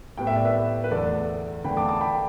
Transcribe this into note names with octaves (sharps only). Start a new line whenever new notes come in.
A2 G3 B3 G5
E5
D5
B4 E5
B4
E2 D3 A3 A4 D5
E2 D3 A3 G5 B5
A5 D6
A5 D6
G5 B5